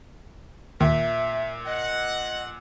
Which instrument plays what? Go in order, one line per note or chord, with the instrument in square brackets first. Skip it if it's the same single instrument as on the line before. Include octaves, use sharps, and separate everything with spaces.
[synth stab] D#2 [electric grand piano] A#2 [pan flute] E5
[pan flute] D#5 [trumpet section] F#5